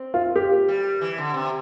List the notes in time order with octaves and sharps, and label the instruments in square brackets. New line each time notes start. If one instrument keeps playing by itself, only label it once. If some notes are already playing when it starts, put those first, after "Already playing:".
Already playing: [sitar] C4
[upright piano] F4
G4
[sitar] G3
E3
D3
C3